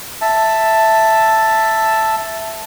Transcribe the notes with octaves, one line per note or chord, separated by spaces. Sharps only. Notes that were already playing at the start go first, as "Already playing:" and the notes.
E5 A5